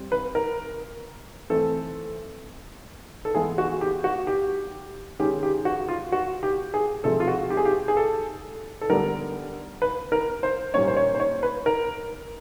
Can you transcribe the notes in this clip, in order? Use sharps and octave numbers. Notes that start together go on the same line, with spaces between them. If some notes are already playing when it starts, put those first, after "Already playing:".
Already playing: G3 C4
B4
A#4
E3 A3 C4 A4
A4
E3 G#3 B3 G#4
F#4
G4
F#4
G4
D#3 G#3 C#4 G4
G4
F#4
F4
F#4
G4
G#4
C3 F3 G#3 A4
F4
F#4
G4
G#4
G4
G#4
A4
A4
D3 G3 B3 D4 A#4
B4
A#4
C5
A#2 G3 A#3 C#4 C#5
C5
C#5
C5
C#5
B4
A#4